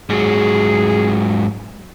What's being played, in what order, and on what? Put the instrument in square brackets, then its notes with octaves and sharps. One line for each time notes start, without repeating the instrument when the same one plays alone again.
[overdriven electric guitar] G#2 F#3 [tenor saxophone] G#4